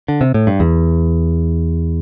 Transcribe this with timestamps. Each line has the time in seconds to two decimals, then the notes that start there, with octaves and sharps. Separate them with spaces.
0.08 D3
0.21 C3
0.34 A2
0.47 G2
0.60 E2